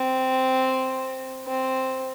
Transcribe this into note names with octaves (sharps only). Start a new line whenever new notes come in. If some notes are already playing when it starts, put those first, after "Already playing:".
Already playing: C4
C4